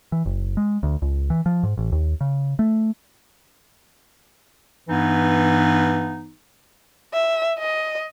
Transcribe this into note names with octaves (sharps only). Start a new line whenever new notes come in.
E3
F#1
G#3
D2
C#2
E3
F3
G#2
A1
D#2
C#3
A3
G2 E3 B3 D#4
E5
D#5